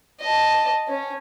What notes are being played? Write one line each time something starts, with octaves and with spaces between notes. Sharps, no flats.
D#5 A5
C#4